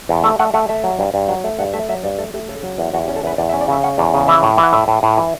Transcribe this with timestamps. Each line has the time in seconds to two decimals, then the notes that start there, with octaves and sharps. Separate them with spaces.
0.09 E2
0.24 A3 E5
0.39 A3 F#5
0.54 A3 F#5
0.69 A3 E5
0.84 F#3
0.99 G2
1.14 G2
1.29 F#3
1.44 A3
1.59 G2 F#5
1.74 A3 E5
1.89 F#3 E5
2.04 G2 D5
2.18 A3 A4
2.34 A3 G4
2.49 C#3 A4
2.64 F#3
2.78 E2
2.94 E2 F#4
3.04 G4
3.08 C#4
3.16 A4
3.23 E2 B4
3.38 E2 D5
3.49 E5
3.53 C#4
3.61 D5
3.68 C#3 E5
3.84 C#4 F#5
3.98 E2 D5
4.14 C#3
4.28 E3 E5
4.43 A2
4.58 E3
4.63 F#5
4.73 A2 E5
4.88 A2
5.03 A2
5.17 E3